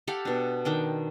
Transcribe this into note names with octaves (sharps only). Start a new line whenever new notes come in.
G4 A4 F5 F#5
B2 D4
D#3 D4 G5